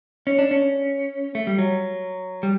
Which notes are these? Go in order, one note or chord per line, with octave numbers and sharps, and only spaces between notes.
C#4
D4
C#4
A3
G3
F#3
G3